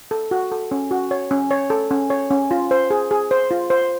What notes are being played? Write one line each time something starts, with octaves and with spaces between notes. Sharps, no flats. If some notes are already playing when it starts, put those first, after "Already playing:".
A4
F#4
A4
C#4
F#4
C#5
C#4
C#5
A4
C#4
C#5
C#4
F4
C5
G#4
G#4
C5
F4
C5